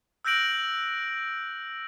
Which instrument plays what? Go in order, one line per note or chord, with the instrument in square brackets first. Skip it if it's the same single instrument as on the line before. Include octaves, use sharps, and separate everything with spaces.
[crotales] E6 F#6 G6 A#6 D7 F#7